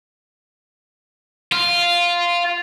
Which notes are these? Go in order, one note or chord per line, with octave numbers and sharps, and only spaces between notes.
F4